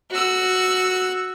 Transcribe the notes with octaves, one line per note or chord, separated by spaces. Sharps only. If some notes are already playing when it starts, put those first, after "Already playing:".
F#4 E6